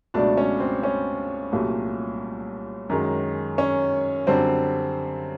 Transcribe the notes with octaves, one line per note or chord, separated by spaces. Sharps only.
C#2 B2 F#3 A3 D4 D5
C#4 C#5
C4 C5
C#4 C#5
C2 A#2 F#3 A3
F#2 D#3 G#3
C#4 C#5
F#2 D3 G3 C4 C5